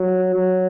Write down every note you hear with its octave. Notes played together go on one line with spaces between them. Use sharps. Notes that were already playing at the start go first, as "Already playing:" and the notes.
Already playing: F#3
F#3